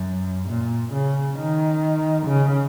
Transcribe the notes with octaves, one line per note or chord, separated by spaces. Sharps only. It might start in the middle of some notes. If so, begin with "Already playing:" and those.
Already playing: F#2
A#2
C#3
D#3
C#3